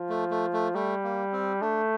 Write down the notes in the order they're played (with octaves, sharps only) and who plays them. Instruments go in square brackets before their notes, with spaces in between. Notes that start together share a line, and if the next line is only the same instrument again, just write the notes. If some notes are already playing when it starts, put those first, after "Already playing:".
Already playing: [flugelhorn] F3
[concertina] A3
A3
A3
[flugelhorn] G3 [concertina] A3
[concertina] A#3
C4
[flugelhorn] A3 [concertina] D4